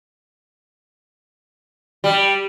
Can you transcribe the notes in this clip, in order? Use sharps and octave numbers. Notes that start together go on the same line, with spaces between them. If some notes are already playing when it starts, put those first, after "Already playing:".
G3